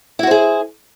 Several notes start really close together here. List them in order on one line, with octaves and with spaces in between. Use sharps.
E4 F#4 C5 G#4